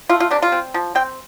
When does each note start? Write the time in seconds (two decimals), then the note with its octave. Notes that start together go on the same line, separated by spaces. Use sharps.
0.09 A3 F4
0.20 F4
0.31 C3 D4
0.42 F4
0.52 C4
0.74 F3
0.95 C4 G5